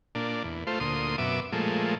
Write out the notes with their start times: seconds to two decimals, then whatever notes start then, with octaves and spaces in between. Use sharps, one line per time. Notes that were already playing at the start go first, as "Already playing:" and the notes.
0.15 A#2 D4
0.44 E2
0.67 A3 F4 C5
0.80 D2 A#2 C6 D#6
1.18 F#2 B2 E5 D6
1.52 A#2 F3 G#3 A3